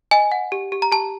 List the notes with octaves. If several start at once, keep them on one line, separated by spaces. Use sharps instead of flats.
D#5 G#5
F#5
G4
G4
A#5
G4 A5